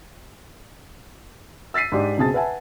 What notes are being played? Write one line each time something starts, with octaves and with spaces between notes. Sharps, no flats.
E6 A6 B6 C7 D#7
G#2 D4 G4
C#2 B2 C4 G#4 A5 A6
B4 E5 F#5 G#5 A5